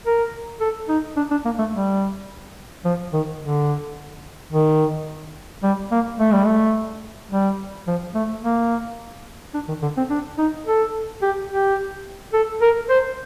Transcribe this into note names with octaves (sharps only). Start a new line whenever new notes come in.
A#4
A4
D#4
D4
D4
A#3
A3
G3
F3
D#3
D3
D#3
G3
A#3
A3
G3
A3
G3
F3
A3
A#3
D4
D#3
D3
C4
D4
D#4
A4
G4
G4
A4
A#4
C5